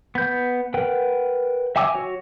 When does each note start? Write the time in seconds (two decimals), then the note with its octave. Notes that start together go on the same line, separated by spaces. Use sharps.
0.15 B3 G6
0.74 A#4 B4 F#5 G5
1.76 E5 G5 G#5 D6 E6
1.95 F#4 C#5